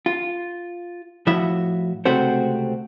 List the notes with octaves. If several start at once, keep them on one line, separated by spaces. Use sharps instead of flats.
F4
A2 F3 E4 F#4 E5
C#2 C3 A3 C4 F#4 C5